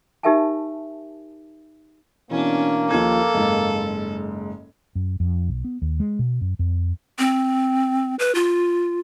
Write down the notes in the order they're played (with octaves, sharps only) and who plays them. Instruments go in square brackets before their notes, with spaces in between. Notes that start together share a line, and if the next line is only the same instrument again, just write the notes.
[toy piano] D#4 G4 A#4 E5 G#5 A5
[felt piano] B2 E3 [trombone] A#3 [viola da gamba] C#4 D4
[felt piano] D#2 F3 G#6 [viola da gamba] A4
[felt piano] F#1 G#2
[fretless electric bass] F#2
F2
B1
B3
D#2
G#3
B2
F#2
F2
[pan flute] C4
B4
F4